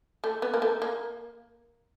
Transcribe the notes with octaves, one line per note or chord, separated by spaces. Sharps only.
A3
B3
A#3
A3
A#3